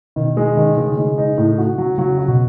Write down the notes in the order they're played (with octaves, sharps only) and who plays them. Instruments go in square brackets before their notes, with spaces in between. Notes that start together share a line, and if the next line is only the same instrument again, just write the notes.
[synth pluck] B2 [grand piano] D#3
[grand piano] G#3
D#3
[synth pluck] C#3 [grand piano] G#3
[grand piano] G#3
D#4
A2
F#4
F#3
[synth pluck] C#3 [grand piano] F#3
[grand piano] F#4
[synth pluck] B2